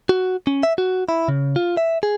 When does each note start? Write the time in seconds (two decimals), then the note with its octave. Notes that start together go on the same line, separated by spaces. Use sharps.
0.09 F#4
0.47 C#4
0.63 E5
0.78 F#4
1.09 E4
1.28 C#3
1.56 F4
1.77 E5
2.03 G#4